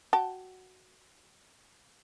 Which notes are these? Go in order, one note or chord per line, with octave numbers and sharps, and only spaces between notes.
F#4 G5 A5